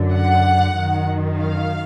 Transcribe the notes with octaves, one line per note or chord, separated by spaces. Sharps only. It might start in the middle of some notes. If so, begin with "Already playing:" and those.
Already playing: F#2 D3
F#5
F#2 D#3
F5